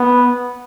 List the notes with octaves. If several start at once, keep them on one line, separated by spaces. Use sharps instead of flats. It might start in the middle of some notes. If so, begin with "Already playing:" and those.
Already playing: B3